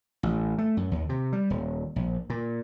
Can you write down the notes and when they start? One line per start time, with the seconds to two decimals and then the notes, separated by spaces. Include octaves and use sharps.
0.23 A1
0.58 A3
0.77 F#2
0.91 D#2
1.09 C3
1.32 G3
1.50 D#1
1.96 A#1
2.30 A#2